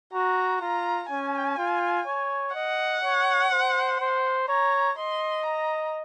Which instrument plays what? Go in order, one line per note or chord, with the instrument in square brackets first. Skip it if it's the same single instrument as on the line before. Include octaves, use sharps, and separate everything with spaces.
[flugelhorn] F#4 [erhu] A#5
[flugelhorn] F4 [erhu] A#5
[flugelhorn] C#4 [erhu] G#5
[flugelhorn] F4
C#5
[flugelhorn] D#5 [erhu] F#5
[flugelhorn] C#5
C5
C5
[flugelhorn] C#5 [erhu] A#5
[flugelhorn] D#5 [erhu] C6
[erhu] A#5